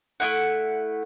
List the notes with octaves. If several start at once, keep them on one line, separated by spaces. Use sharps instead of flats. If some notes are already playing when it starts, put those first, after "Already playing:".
A3 B3 E4 F#5